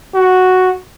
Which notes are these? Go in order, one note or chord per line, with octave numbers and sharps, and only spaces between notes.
F#4